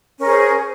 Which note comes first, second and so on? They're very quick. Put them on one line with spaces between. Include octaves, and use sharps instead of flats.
C#4 A#4 G#4 C5